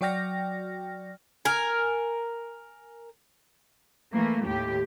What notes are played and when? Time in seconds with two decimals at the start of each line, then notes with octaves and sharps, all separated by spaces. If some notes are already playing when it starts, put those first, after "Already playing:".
0.01 F#3 F#4 D5 G5 F6 A#6
1.45 A#4 G#5
4.13 E3 A3 A#3
4.46 D#2 A2 G4